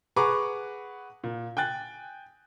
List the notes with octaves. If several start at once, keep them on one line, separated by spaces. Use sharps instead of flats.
G#4 B4 F#5 A#5 C#6 D6
A#2
G5 G#5 F#6 A6